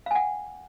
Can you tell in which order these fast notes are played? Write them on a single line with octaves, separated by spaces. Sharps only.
F5 G#5 F#5